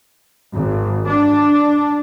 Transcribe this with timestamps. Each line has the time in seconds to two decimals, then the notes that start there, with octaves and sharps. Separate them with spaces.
0.54 G#1
1.07 D4